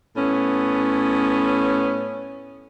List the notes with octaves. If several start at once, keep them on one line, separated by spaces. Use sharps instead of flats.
A2 B3 C#4